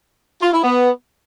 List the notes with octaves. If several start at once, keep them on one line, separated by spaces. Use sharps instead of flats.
F4
E4
B3